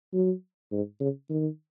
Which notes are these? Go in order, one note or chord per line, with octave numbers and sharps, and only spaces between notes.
F#3
G#2
C#3
D#3